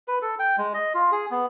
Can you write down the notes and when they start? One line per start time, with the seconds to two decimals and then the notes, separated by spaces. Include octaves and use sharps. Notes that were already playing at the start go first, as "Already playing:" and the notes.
0.08 B4
0.22 A4
0.39 G5
0.58 G#3
0.74 D#5
0.94 F4
1.12 G#4
1.31 B3